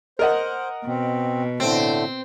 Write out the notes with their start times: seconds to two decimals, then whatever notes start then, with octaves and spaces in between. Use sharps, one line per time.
0.19 A#4 C5 D#5 F#5
0.86 B2 C4
1.60 A2 D3 A3 C4